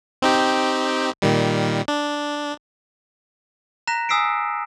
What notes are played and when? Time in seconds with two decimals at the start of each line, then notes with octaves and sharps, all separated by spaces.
0.22 C4 D#4 G4
1.22 A#2 D#3 G3
1.88 D4
3.87 A#5 F#6 A#6 B6 E7
4.09 G#5 D#6 E6 B6 C7 D7